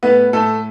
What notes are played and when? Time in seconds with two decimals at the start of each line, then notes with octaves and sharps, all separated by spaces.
0.03 A2 B3 B4
0.33 A2 A3 A4